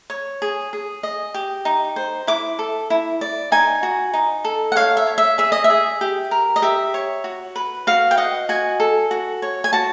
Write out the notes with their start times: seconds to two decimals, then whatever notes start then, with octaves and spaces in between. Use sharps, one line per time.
0.10 C#5
0.42 G#4
0.73 G#4
1.03 D#5
1.34 G4
1.65 D#4
1.96 C5
2.27 E4 D6
2.59 A4
2.90 E4
3.21 D5
3.52 D#4 G#5
3.83 F#4
4.13 D#4
4.45 A4
4.72 F#5
4.76 C#5 F5
4.97 E5
5.07 C#5
5.18 E5
5.38 G#4 E5
5.52 D#5
5.64 E5
5.70 G#4
6.01 G4
6.31 A#4
6.56 D#5
6.62 G4 E5
6.94 C#5
7.24 F#4
7.56 B4
7.87 F#4 F5
8.11 G5
8.17 D#5 F#5
8.49 F#4 G#5
8.80 A4
9.11 F#4
9.42 C#5
9.64 G#5
9.73 F#4 A5